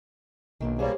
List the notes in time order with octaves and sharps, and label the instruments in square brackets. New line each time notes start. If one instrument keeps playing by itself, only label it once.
[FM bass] B1 [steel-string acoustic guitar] D#3 A#3 D4
[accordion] G3 A#3 [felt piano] G4 C#5 [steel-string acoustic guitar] G#4 C5